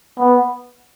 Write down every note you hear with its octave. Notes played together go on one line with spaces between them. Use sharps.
B3